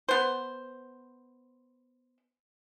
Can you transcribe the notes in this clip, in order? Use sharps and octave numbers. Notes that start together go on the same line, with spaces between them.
B3 C5